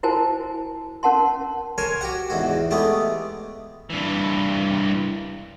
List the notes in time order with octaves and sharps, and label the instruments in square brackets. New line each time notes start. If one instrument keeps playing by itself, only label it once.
[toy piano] E4 F#4 A#4 C5 G#5 A5
C#4 A#4 F#5 A5 C6
[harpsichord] A#4 C5 C#5 G#5
F#4 G4 F#5
E2 G#2 F#4
G#3 A3 B3 G4
[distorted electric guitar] G2 E3